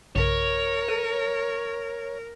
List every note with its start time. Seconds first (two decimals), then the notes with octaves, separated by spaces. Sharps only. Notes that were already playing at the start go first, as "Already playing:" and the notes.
0.16 B1 G2 C#3 A#4 C#5
0.88 A4 B4 D#7